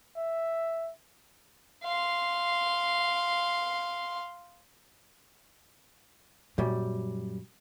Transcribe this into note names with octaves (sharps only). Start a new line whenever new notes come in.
E5
F5 C6
F#2 A#2 G3